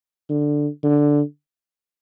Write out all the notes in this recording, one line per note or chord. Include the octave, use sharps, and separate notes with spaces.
D3
D3